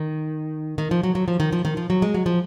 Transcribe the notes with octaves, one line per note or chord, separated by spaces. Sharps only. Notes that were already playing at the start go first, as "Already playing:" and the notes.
Already playing: D#3
D#3
F3
F#3
F#3
F3
D#3
F3
D#3
F3
F#3
G#3
F#3
F3